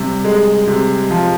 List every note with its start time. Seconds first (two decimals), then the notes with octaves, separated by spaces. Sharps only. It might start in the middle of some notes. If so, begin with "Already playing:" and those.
Already playing: C3 G3
0.25 G#3
0.67 C3
1.10 F3